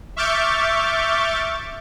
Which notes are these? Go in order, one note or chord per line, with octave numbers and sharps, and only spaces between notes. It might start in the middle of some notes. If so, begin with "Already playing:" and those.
E5 C#6 D6 F6 G6 A6